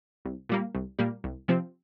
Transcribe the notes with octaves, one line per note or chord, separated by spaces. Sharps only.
C2
A#2 G3 A#3
C2
A#2 G3 A#3
C2
C3 F3 C4